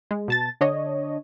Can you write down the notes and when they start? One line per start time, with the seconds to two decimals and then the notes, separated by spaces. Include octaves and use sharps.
0.11 G#3
0.28 B2 A5 A6
0.61 D3 D4 C#5 D#5